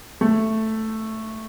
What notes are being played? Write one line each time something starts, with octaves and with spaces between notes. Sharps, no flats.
A3